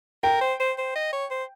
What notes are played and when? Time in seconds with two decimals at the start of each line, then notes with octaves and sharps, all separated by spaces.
0.23 A#4 G5
0.41 C5
0.60 C5
0.78 C5
0.95 D#5
1.13 C#5
1.31 C5